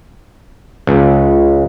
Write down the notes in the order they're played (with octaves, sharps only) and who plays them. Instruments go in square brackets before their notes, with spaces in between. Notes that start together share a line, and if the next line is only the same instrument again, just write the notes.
[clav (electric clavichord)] C#2